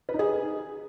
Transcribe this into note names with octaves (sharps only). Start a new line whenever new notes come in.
B4
D#4
G#4